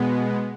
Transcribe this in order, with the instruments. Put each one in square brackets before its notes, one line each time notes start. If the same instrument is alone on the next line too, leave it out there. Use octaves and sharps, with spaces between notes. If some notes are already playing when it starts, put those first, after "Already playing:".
Already playing: [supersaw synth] B2 G#3 B3